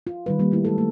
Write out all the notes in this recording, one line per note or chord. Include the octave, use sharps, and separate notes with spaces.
F4
D#3 G3 B4
G3 A#3
A3 E4
G#3 E4 A4
A3 A#3